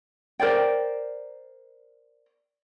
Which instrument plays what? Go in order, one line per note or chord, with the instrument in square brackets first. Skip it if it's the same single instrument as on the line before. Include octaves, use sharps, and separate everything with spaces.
[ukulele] A#4 C5 D5 G5